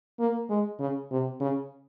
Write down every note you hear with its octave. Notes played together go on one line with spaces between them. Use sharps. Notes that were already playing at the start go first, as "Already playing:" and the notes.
A#3
G#3
C#3
C3
C#3